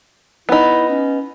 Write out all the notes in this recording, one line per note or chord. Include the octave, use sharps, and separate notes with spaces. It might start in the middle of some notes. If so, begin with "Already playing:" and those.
B3 D#4 E4
C#4